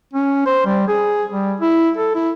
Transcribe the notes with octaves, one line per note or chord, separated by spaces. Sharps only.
C#4
C5
G3
G#4
G3
E4
A4
E4